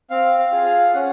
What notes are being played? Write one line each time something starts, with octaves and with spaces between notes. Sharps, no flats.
C4 F5
F5
F4 G#4
F5
C#4 F#5